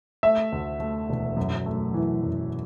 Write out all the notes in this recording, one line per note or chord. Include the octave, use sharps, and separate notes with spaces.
A3 E5
D2
A3
E1
F#2
A3
E3
F#2